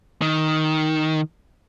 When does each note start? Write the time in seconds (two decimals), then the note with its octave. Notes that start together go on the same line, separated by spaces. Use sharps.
0.22 D#3